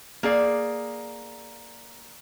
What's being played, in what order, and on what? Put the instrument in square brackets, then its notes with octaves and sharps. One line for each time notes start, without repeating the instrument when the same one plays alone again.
[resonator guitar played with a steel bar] A#3 G#4 D5